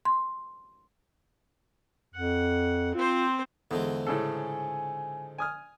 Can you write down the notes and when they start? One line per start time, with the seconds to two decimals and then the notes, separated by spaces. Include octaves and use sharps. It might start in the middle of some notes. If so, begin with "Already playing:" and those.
0.05 C6
2.15 F2 F#5
2.95 C4 F4 C5
3.71 E2 D3 F3 G#3
4.07 A2 C#3 A4 G#5
5.38 G#5 D#6 F6